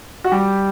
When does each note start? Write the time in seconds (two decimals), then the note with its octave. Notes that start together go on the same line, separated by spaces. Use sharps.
0.24 F#4
0.31 G3 G4